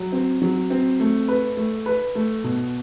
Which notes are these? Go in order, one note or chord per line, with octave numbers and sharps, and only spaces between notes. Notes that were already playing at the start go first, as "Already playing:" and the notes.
Already playing: F#3
C4
F#3
C4
A3
B4
A3
B4
A3
B2